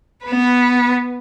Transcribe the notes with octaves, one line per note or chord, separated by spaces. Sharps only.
B3 B4